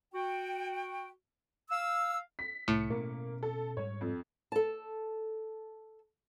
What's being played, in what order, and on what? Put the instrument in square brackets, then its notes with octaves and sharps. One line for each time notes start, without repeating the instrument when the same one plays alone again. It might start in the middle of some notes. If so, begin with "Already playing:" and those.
[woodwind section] F#4 G5
F5 E6
[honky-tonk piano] B6
[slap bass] C2 [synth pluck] A2 [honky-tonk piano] C#7
[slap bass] B2 C4 C#4 [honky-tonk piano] A#3
[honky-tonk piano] A4
[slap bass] G#2 G3 [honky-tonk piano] C#5
[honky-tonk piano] F2
[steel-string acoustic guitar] A4 A5